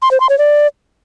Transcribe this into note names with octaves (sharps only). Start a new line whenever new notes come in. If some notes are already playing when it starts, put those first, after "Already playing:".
C6
C5
C6
C#5
D5